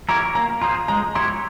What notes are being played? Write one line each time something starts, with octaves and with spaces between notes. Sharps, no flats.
E4 G4 A#4 C#5 A#5
A#3 A#5
F4 G#4 C5 A#5
G#3 A#5
E4 G4 C#5 C6